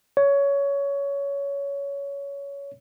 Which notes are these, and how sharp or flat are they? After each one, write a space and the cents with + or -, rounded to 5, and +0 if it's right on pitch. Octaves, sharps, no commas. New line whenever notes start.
C#5 +15